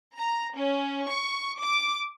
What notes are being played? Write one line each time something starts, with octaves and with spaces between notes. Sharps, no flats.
A#5
C#4
C#6
D6